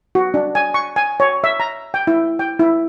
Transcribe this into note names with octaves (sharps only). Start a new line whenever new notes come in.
F#4
D4
G#5
C#6
G#5
C#5
E5
A#5
G5
E4
G5
E4